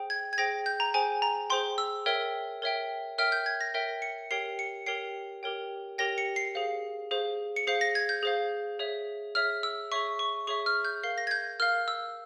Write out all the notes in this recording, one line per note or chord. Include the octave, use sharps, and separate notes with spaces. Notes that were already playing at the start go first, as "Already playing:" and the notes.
Already playing: G#4 C5 G5
G#6
G#6
G#4 C5 G5 A#6
G6
A#5
G#4 C5 G5 G#5
A#5
G#4 C5 G5 C6
E6
A#4 C#5 E5 G5
A#4 C#5 E5 G5
A#4 C#5 E5 G5 F6
G6
G#6
A#6
A#4 C#5 E5 G5
C#7
G4 A#4 C#5 G5 C7
C#7
G4 A#4 C#5 G5 C7
G4 A#4 C#5 G5
G4 A#4 C#5 G5 A#6
C#7
C7
G#4 C5 F5
G#4 C5 F5
C#7
G#4 C5 F5 C7
A#6
G#6
G6
G#4 C5 F5
G#4 C#5 E5
G#4 C#5 E5 F6
E6
G#4 C#5 E5 C#6
C#6
G#4 C#5 E5 C#6
F6
G6
A#4 F5 C7
A#6
G#6
G6
A#4 F5 F6
E6